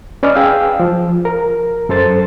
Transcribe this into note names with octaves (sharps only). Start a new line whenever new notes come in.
C#4 B4 D5 D#5 F6
G#4 F5 G5 E6
F3
A#4
F#2 A4 C5 A6